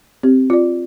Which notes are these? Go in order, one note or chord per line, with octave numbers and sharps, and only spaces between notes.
C4 G4
F4 D5